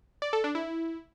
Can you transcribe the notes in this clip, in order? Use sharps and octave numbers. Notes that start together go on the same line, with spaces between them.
D5
A4
D4
E4